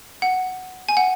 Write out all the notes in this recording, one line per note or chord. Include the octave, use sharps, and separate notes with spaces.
F#5
G#5
F#5